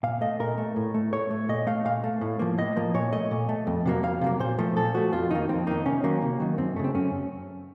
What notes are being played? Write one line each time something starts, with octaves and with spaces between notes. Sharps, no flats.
A#2 F5
A3 D#5
A#2 A#4
A3
A2
A3
A2 C#5
A3
A#2 D#5
A3 F5
A#2 F5
A3
A2
F3 A#3
A2 D#5
F3 A#3
A#2 C#5
A3 D#5
A#2
A3
F2
C3 F#3 A#3
F2 F5
C3 F#3 A#3
A#2 C5
F3 A3
A#2 A4
F3 A3 F#4
F2 F4
D#3 A#3 D#4
F2 C4
D#3 A#3 D#4
C3 C#4
D#3 F#3 A#3
C3
D#3 F#3
F#2 C4
C#3 A3
C4
F#2 C#4